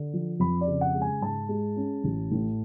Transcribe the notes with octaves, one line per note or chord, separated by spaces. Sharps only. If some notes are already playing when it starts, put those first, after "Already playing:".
Already playing: D3
F3
F2 B5
D5
C#3
F#5
G#3
G#5
G#2 A5
G#3
C#4
A1
A2